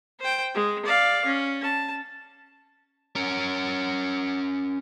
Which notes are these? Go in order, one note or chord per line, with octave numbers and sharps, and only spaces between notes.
C5 G5
G#3
D5 F5
C#4
A5
C#4 A#4